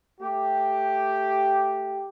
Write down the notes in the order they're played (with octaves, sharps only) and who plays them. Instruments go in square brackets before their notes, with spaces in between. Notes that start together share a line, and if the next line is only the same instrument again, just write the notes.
[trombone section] A3 G4